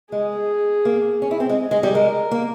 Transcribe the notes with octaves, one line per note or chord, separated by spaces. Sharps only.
G#3 G#4
A#3
C#4
E4
C4
G#3
G#4
G#3
G3
G#3 A#4
A#3